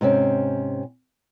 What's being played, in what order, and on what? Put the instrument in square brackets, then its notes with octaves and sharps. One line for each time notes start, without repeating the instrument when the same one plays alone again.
[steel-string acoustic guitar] G#2 C3 C4 C#4